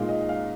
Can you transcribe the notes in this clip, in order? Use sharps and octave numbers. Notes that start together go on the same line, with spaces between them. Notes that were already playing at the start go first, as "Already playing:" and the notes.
Already playing: A#2 G#3 D#4 F5
D#5
F5